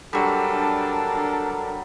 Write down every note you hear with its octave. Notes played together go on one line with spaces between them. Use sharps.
F#3 G3 D4 A4 A#4